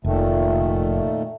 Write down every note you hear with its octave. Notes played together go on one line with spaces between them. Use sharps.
F1 A#2 D#3 A3